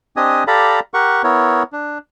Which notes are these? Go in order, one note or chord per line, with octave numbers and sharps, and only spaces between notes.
C4 D4 G4 D#5 G#5 D#6
G4 A4 D5 F5 A#5 B5
G4 A#4 F#5 C#6
B3 E4 A#4 C#5
D4